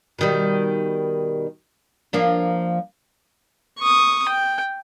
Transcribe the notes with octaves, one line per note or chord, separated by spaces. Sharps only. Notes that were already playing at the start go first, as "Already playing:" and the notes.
B2 D#3 G3
F3 A#3 D4
C#6 D#6
G5